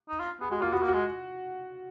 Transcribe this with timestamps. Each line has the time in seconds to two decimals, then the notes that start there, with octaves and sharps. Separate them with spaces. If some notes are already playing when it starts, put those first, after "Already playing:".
0.09 D#4
0.20 F4
0.41 B3 G#4
0.51 G#3 F#4
0.62 A#3 F4
0.72 B3 F#4
0.83 A#3
0.88 F#4
0.93 G#3